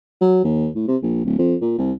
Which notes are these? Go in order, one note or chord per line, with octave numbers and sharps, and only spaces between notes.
F#3
D#2
A2
C3
A#1
D1
F2
A#2
C2